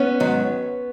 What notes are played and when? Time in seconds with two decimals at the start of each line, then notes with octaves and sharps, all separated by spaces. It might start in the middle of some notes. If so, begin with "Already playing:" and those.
Already playing: B3 C#4
0.20 G#2 D#3 F#3